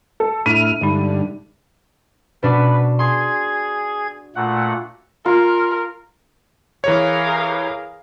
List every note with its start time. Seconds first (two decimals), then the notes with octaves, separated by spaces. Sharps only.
0.20 A4
0.46 A2 D4 E4 F6 D#7
0.81 G2 D3 G#3 D#4
2.43 B2 D4 F#4 B4
2.99 G#4 C6 G#6
4.35 A#2 A3 F#5
5.26 F4 A#4
6.84 E3 G#4 A#4 C#5 F5